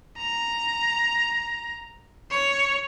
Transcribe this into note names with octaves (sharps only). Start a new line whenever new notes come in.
A#5
C#5